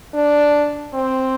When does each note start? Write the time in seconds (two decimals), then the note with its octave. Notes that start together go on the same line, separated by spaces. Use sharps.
0.14 D4
0.93 C4